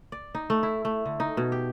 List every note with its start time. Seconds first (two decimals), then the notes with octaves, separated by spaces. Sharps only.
0.12 D5
0.35 D#4
0.50 A3
0.63 E4
0.85 A3
1.06 D3
1.20 D#4
1.37 B2
1.52 G4